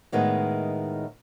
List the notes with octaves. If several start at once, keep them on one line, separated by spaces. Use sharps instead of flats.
A2 D#3 G#3 B3